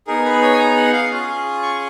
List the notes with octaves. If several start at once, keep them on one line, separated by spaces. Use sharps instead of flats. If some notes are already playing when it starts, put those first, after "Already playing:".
B3 D#4 G#4 A#4
B4
C#5
G#5
A#5
F#5
F5
C#4 F4 G#4
C#6